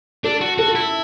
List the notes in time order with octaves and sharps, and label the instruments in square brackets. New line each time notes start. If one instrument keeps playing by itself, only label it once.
[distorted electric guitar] D4 [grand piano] A4
[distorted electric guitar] F#4
[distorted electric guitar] F#4 [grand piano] A4
[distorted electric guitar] E4